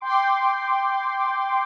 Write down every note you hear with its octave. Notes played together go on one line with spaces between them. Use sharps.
G5 C6 D6